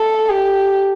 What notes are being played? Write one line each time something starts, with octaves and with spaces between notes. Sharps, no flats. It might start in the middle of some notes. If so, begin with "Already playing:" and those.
Already playing: A4
G4